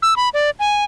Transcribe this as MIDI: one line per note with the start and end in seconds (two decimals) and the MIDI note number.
0.02 0.14 88
0.17 0.29 83
0.34 0.50 74
0.60 0.84 80